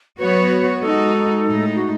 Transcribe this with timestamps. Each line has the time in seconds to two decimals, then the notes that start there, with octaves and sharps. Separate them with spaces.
0.19 F#3 B3 F#4 B4 C#5
0.81 G#3 D#4 F#4 A4
1.43 A2 G#3 D#4
1.75 F#4